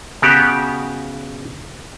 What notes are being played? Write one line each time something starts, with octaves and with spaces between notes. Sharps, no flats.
C#3 B3 F#4 G4